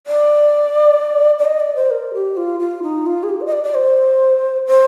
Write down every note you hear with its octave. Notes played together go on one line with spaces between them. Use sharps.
D5
D5
D#5
D5
C5
A#4
G4
F4
F4
D#4
F4
G#4
G4
D5
D#5
D5
D5
C5
C5